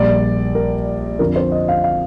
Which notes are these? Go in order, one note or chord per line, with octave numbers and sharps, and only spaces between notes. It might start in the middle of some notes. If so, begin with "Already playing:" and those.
Already playing: A#1 A#2 G3 D5
A#4
F2 D3 F3 A#4
C5
D#5
F5
F5